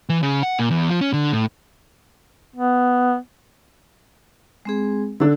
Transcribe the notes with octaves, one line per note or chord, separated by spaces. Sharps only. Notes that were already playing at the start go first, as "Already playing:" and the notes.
E3
C#3
F#5
A#2
E2
F3
C#4
D3
A2
B3
G#3 C4 G#4
D3 D4 E6